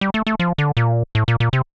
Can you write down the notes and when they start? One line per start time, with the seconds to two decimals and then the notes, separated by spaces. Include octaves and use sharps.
0.01 G3
0.14 A3
0.27 A3
0.40 F3
0.58 D3
0.77 A#2
1.15 A2
1.28 A#2
1.40 A#2
1.53 C3